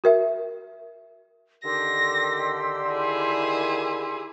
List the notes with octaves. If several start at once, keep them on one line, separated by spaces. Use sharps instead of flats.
F#4 A#4 E5
D3 D#3 G4 C6 E6 A#6
E4 G#4